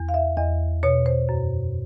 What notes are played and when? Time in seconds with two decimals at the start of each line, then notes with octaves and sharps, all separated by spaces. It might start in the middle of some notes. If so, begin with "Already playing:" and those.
Already playing: E2
0.09 F5
0.14 E5
0.37 E2 D#5
0.83 B2 C#5
1.06 C5
1.29 F#2